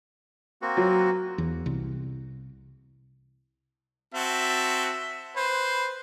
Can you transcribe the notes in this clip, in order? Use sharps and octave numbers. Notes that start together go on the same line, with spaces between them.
A#3 C4 F#4
F#3
E2
C2
C4 F#4 E5 A5
B4 C5